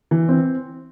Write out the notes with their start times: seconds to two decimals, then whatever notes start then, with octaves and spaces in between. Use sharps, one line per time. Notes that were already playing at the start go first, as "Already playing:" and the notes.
0.11 E3
0.29 C4